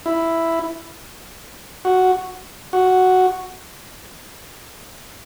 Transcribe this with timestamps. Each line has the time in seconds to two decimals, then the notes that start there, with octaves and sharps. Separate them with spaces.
0.06 E4
1.85 F#4
2.73 F#4